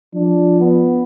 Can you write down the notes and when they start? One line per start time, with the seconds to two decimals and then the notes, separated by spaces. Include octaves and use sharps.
0.14 F3 D4
0.60 B3